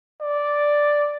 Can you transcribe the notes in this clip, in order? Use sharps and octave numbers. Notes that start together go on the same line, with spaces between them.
D5